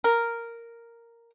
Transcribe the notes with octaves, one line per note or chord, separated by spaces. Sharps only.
A#4